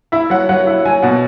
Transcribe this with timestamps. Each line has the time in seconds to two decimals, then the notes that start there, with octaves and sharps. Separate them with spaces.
0.12 E4 E5
0.30 F#3 F#5
0.49 F#3 F#5
0.67 E4
0.85 F#3 G#5
1.03 B2 F#5